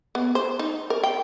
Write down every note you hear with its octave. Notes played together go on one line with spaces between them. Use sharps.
B3
C5
D#4
A#4
G5